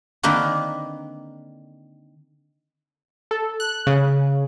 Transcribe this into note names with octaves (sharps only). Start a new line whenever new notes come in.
D3 D#3 A#3 C4 A#4 B4
A4
F#6
C#3